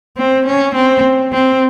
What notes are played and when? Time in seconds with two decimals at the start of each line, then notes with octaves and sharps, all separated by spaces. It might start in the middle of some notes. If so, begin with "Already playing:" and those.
0.18 C4
0.46 C#4
0.75 C4
1.33 C4